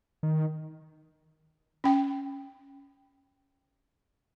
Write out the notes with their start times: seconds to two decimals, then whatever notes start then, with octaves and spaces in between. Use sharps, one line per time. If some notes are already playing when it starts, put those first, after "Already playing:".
0.23 D#3
1.84 C#4 G5